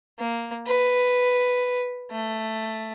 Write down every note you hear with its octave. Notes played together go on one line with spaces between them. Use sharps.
A#3
B4
A3